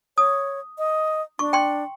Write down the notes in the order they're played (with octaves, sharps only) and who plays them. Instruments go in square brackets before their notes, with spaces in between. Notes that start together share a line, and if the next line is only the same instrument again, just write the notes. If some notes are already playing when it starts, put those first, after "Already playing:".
[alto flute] C#5 [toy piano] D#6
[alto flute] D#5
[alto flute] D4 [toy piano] C#6
[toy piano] G5 C6